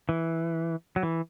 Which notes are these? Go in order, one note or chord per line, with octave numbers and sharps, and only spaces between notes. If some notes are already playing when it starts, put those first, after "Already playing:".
E3
F#3
E3